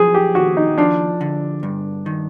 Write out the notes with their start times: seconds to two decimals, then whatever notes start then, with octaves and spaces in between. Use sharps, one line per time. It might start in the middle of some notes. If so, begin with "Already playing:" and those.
Already playing: F3 F#3 G#4
0.14 G4
0.35 D#2 F#4
0.57 D#4
0.78 F3 D4
1.21 D3
1.63 G2
2.06 D#3